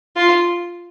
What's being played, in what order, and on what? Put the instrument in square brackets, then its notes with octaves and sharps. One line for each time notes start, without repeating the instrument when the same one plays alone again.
[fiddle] F4